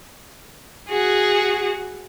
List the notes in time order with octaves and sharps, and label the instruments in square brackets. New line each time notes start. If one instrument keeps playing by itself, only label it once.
[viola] F#4 G#4